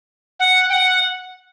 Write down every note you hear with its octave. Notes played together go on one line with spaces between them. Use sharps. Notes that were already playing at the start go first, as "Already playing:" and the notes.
F#5
G5
F#5